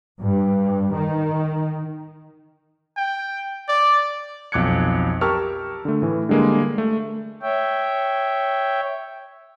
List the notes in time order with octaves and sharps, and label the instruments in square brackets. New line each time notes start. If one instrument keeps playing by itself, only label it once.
[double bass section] G2
D#3
[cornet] G5
D5
[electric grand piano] B1 F2 D6 F#6 G#6 C#7
G4 A#4 A5 C#6 E6 F6
D3 A3
A2 E3
D3 G3 G#3 A#3
A3
[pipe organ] C#5 E5 G5